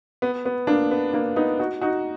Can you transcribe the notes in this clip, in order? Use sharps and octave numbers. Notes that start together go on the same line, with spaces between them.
B3
B3
A#3 D4
B3
A#3 D4
B3 D#4
D#4 F#4
D#4 F#4